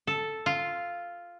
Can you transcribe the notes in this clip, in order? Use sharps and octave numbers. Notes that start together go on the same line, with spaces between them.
A4
F4